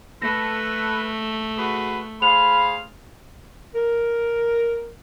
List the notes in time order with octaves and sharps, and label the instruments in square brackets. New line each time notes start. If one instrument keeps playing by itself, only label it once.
[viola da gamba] A3 [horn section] A4 B4 [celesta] A#6
[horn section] F#4 G#4 B4
[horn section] G#4 C5 F5 [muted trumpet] B5 [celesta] F7
[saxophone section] A#4